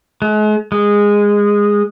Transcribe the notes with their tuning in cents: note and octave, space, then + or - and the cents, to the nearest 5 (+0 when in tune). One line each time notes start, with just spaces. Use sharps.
G#3 +40
G#3 -15